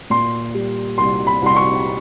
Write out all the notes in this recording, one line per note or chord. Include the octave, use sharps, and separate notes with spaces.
A#2 C6
G3
C2 C6
B5
C2 C6
C#6